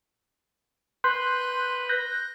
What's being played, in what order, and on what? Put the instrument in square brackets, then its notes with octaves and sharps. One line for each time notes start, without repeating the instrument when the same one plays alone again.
[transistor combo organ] B4 [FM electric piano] C6 F#6 G6
[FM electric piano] F#6 G6 A#6